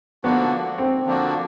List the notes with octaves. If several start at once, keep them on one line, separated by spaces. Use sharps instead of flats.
D3 F3 A#3 B3 D4 F#4
C4
D3 F3 A#3 D4 F#4